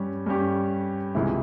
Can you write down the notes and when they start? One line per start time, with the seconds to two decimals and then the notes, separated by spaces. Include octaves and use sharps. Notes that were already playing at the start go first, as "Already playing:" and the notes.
Already playing: G2 G3 C#4 G4
0.26 G2 G3 C#4 G4
1.15 C#2 C3 E3 G#3 E4